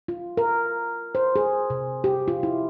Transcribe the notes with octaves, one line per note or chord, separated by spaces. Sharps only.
F4
A#4
C5
G#4
C3
G4
F4
E4